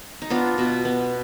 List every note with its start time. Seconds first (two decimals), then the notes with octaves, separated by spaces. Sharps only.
0.22 D#4
0.30 B3 D4 F4
0.58 B2
0.85 B3